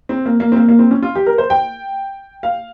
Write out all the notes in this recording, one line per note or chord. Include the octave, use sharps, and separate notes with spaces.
C4
A#3
A#3
C4
A#3
A#3
C4
C#4
F4
G4
A#4
C5
G5
F5